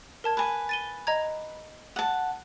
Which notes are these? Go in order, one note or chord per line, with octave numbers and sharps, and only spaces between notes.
A#4 A5 G#6
B4 G#5
A6 D#7 G7
D#5 A#5 G#6
F#5 A5